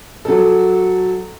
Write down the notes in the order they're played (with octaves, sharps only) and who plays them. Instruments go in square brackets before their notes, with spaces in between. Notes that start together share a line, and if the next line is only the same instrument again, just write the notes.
[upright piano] F#3 A4